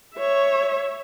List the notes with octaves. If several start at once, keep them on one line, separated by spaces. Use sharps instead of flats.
C#5 E5